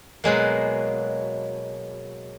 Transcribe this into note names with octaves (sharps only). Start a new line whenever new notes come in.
B2 F#3 G#3 A#3